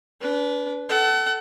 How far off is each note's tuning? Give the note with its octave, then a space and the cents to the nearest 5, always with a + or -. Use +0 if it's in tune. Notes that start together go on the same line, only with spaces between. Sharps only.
D4 -35 B4 +0
A4 +0 F#5 +35